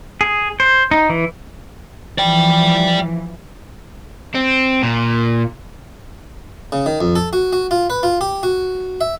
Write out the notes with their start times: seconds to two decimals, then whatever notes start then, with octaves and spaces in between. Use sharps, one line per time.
0.21 G#4
0.60 C5
0.91 D#4
1.10 E3
2.18 E3 F3 D5 G5
4.35 C4
4.83 A#2
6.72 C#3
6.86 D#3
7.01 F2
7.15 A4
7.33 F#4
7.53 F#4
7.71 F4
7.90 B4
8.03 F4
8.21 G4
8.43 F#4
9.01 E5